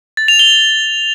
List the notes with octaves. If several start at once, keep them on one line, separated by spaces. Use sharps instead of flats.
A6
F7
G7